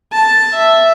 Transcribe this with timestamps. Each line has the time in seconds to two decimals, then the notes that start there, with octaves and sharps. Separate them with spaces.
0.13 A5
0.54 E5